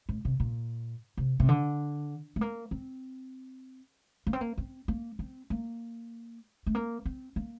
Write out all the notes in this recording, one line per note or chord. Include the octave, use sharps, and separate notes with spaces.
A2
C3
A#2
C3
C3
D3
A3
A#3
C4
A#3
C4
A#3
C4
A#3
C4
A#3
A3
A#3
C4
A#3